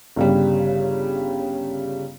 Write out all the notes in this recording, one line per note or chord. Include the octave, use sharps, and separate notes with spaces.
G1 C#3 G3